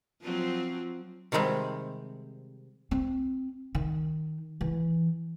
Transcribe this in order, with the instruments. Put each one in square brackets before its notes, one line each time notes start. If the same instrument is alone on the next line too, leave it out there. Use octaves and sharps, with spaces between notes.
[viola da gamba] F3 F#3 C4
[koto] C3 D#3 G3 G#3 C4
[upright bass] C4
D#3
E3